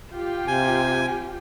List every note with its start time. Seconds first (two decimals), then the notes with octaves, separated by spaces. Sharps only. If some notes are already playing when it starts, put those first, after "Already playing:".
0.14 F4 G4 G5
0.48 C3 G#5